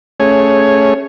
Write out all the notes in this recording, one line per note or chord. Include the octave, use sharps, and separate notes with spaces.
A3 C#4 G#4 C#5